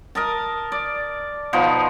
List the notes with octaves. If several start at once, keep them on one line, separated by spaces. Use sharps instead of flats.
A#4 D#5 A5
D5
B2 F3 D#4